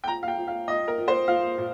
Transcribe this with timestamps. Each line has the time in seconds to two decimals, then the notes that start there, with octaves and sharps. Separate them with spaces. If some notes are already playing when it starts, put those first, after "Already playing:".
0.04 G5
0.08 F3 A#5
0.23 F5
0.28 G5
0.38 F3
0.48 F5
0.68 F3 D#5
0.88 A#4
0.98 F3
1.08 C5
1.28 F3 F5
1.58 A#2